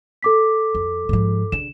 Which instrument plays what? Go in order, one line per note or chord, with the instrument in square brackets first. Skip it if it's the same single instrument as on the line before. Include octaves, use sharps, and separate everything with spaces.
[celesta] A4 D6 B6
[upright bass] F2
G#2 F3
[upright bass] C#3 D4 [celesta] E7